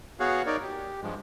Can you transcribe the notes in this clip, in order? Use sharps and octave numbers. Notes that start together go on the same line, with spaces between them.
B3 F#4 G#4 C#5 F5 F#5
D#4 A#4 C#5 D5
G4
G2 F3 G#3